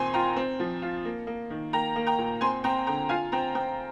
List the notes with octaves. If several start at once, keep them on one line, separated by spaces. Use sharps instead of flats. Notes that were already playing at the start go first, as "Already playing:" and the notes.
Already playing: A#2 D#3 C4 G#5 C6
F4 G5 A#5
C4
F3
F4
A#3
A#3
D#3
A#3 G5 A#5
A#3
G5 A#5
A#2
C4 G#5 C6
C4 G5 A#5
D3 G5 A#5
F4 F5 G#5
C4 G5 A#5
C4 G5 A#5